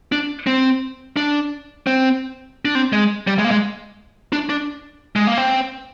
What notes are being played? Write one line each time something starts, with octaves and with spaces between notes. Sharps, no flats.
D4
C4
D4
C4
D4
C4
G#3
G3
G#3
A#3
G#3
D4
D4
G#3
A#3
C4